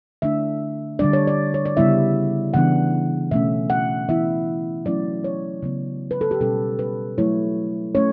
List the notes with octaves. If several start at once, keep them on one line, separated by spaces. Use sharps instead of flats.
D3 A3 D4 E5
D3 G3 D4 D5
C#5
D5
C#5
D5
C#3 G3 B3 E4 E5
C#3 E3 B3 D4 F#5
B2 A3 C#4 E5
F#5
E3 B3 E4 E5
F#3 A3 C#4 E4 D5
C#5
C#3 F#3 B3
B4
A4
G4
B2 G3 C#4 A4
B4
F#3 A3 E4 C#5
A3 C#4 C#5